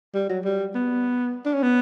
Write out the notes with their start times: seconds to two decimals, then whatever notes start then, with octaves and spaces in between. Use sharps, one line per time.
0.14 G3
0.29 F#3
0.45 G3
0.75 B3
1.45 D4
1.54 C#4
1.63 B3